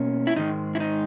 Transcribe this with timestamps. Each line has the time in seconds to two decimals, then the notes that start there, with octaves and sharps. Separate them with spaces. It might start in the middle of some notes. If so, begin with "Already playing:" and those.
Already playing: B2 A#3 C#4
0.27 E4
0.36 G#2 D#3 G#3 D#4
0.75 E4
0.80 D#4